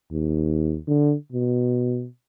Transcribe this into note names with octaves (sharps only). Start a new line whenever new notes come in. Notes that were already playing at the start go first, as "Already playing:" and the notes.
D#2
D3
B2